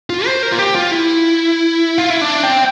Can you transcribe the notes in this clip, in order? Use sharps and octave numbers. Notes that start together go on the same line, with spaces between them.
F4
C5
A#4
F4
G4
F4
E4
F4
E4
D4
C4